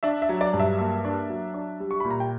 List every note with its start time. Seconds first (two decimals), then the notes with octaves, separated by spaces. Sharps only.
0.03 D4 E5
0.22 E5
0.29 F#3
0.41 D5
0.54 G2
0.60 E5
0.78 A#3 E5
1.05 D4
1.29 F#3
1.54 D4
1.80 G3
1.91 C#6
2.00 A#2 B5
2.11 A#5
2.20 G5